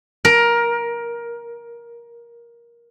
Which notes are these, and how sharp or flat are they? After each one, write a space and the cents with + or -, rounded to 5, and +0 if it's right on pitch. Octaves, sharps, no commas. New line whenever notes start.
A#4 +15